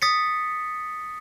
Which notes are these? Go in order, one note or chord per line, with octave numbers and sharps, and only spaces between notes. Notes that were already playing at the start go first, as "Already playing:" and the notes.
D#6 A6 B6 C#7